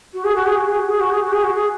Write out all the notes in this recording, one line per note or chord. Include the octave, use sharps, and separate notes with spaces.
F#4
G#4
F#4
G#4
F#4
G#4
F#4
G#4
F#4
G#4
F#4
G#4
F#4
G#4